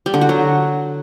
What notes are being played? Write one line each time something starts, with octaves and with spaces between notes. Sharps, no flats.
G3
D3
F#4
F#3